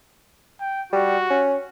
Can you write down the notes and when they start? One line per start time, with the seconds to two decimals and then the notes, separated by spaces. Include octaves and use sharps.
0.60 G5
0.92 G3 F#4
1.30 C#4